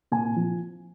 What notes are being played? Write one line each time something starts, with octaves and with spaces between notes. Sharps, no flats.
A#2 G#5
F3